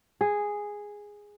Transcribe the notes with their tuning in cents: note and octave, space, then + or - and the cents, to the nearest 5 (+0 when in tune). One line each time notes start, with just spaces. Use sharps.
G#4 -5